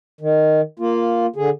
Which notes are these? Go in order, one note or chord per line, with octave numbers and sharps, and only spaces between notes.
D#3
A#3 F4
D3 G#4